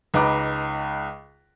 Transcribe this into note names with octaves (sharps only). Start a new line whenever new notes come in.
C#2 D#4 B4 A#5 B5 D6